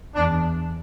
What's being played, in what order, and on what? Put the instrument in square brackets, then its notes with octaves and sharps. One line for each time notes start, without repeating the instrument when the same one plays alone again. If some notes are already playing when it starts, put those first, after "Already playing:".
[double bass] E2 [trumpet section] D4